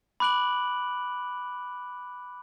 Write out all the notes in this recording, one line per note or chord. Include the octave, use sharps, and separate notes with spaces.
B5 D6 F#6 D7 F#7